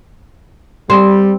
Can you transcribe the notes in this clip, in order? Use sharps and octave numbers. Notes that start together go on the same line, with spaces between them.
G3 C4